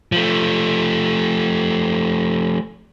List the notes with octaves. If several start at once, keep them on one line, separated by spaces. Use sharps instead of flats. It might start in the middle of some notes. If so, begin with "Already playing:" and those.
F3 A3